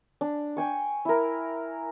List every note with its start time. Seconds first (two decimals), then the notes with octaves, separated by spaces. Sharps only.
0.21 D4
0.57 G5 G#5 C#6
1.05 E4 A#4